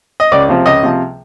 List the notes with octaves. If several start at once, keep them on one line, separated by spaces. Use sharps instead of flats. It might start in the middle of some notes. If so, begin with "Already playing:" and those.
D#5
C#2 D5
C3 F3
C#2 D#5
C3 F3